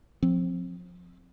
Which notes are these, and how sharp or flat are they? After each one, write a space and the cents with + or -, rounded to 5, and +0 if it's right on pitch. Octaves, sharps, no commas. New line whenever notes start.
F3 +25 C4 +0